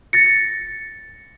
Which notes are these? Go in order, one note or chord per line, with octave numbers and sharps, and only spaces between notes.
A6 A#6 C#7